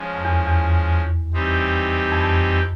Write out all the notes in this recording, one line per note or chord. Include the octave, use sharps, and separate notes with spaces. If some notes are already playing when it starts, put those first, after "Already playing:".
Already playing: F3 G#3 C#4
F2
E2
E2
E3 G3 C4 D#4 G4
F2